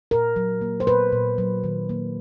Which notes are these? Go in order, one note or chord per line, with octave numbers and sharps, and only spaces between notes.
A#2 A#4
F#3
A#3
C5
A#2 B4
A#2
F#3
D#3
A#3